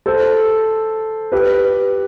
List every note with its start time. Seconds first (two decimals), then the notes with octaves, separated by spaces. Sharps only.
0.06 A4 C5
1.32 G4 B4